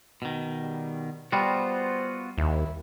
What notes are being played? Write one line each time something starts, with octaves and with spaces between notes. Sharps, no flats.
B2 D#3
G3
G3 B3 F4 F#4 C5
D#2 E4